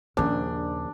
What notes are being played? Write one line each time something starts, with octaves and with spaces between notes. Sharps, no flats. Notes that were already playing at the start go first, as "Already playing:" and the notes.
A#1 D#2 C#3 D4